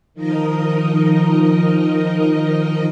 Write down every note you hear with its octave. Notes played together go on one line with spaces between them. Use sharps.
D#3 F3 D#4 A#4 D#5